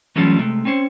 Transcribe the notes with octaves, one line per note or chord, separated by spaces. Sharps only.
E3 F#3 G3 A3 C#4 F4
C3 G#3 A3
C4 C#4 C5 C#5